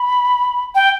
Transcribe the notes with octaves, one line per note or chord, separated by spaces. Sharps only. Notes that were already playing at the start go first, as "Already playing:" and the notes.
Already playing: B5
G5